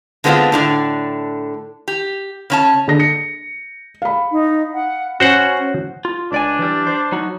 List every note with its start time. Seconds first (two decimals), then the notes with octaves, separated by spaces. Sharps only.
0.24 D3 G#3 B3 C4 D4 F4
0.52 A2 D3 D4
1.88 G4
2.50 C#3 C#4 A5
2.88 D3 A#6
3.00 C#7
4.02 F5 B5
4.32 D#4
4.74 F#5
5.20 C#4 F#4 C5 F#5
6.05 F4
6.32 C#2 D4 D5 G#5
6.59 E3 G3
6.87 C5
7.12 F#3 D#4 F#4